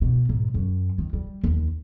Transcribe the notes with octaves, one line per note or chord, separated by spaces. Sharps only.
B2
G#2
F#2
D#3
G3
D#2